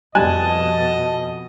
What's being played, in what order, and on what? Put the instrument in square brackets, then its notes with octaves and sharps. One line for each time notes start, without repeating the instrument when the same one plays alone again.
[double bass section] F2 B2 [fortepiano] G3 G#5 F#6 [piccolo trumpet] D#5 [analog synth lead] A5